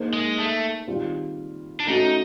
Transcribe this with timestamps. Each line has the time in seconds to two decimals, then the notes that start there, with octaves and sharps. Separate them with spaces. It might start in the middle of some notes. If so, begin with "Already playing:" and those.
Already playing: A#3 D#4 G#4 C5
0.13 G#3
0.38 A3
0.87 D#3 G3 C4 F4
1.80 D4
1.87 A3 C#4 D#4 F#4